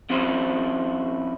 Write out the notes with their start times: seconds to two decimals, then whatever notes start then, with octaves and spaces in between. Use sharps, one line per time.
0.10 F3 C4 C#4 E4 C5